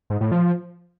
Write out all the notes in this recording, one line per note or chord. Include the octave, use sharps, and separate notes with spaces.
G#2
A2
F3